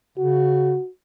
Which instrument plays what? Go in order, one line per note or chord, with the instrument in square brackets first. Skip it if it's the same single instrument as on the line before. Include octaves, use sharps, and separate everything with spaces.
[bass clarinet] C#3 [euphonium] F#4